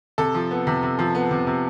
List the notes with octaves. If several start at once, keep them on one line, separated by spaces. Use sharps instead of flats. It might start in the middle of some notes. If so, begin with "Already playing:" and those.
C3 A4
F3
B3
C3
C3
F3
B3
C3
C3